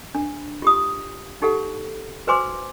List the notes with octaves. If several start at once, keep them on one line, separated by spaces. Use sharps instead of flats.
D4
F4 G4 D#6
D#4 G4 A4 F#5
F#4 B4 C5 G#5 C6 D6